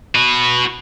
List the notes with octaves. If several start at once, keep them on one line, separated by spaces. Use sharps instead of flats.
F#4 B4